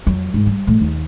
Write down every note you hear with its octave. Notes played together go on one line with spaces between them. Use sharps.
F2 F#3
G#2
G3
A1 A2
D#2